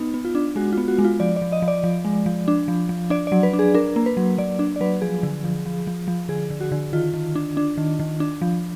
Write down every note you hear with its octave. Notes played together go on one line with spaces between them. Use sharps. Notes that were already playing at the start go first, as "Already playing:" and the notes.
Already playing: B3 D#4
B3
F4
D4
G#3 F#4
B3 F4
F#4
G#3
F4
F3 D5
D5
F3
D#5
F3
D5
F3
G#3
F3
D4
F3
F3
D4 D5
F#3 D5
B4
D4
G#4
D4 A#4
A#3
B4
F#3
F#3 D5
D4
D5
F#3 B4
F3 G#4
D3
F3
F3
F3
F3
D3 G#4
D3
F#4
D3
D#3 F4
D#3
D4
D4
D#3
D#3
D4
F3